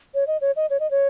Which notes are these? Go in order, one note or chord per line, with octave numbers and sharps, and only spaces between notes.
C#5
D#5
C#5
D#5
C#5
D#5
C#5